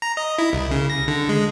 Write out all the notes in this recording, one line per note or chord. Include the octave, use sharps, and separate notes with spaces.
A#5
D#5
E4
C2
C#3
A#6
D3
G#3